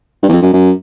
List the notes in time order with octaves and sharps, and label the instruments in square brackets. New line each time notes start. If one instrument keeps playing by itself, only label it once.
[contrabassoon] G2
E2
F2
F#2
F#2